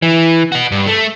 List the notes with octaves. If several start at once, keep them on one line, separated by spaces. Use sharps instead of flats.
E3
F#4 B4
G2
A3